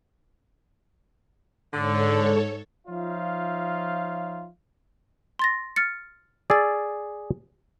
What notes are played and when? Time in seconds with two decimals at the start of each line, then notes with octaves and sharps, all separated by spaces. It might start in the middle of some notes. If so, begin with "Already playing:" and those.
1.73 G#2 D3 A4 C#5
2.88 F3 D#4 F4 C#5 E5 F5
5.39 C6 A6 A#6
5.76 F6 A6 C#7
6.50 G#4 D5 E6 A6